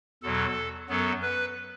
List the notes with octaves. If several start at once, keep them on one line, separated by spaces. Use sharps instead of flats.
E2 B2 F#3 A4
F#2 F#3 B3 A4
B4